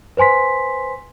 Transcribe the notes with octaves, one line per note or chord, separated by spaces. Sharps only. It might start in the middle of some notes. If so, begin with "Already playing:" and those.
B4 C5 G#5 C6 B6